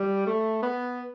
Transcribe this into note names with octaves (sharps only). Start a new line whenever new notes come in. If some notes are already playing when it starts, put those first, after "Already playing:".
Already playing: G3
A3
B3